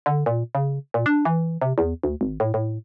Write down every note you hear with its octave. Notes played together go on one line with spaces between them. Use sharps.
D3
A#2
C#3
A#2
D4
E3
C3
E2
D2
G#1
A2
A2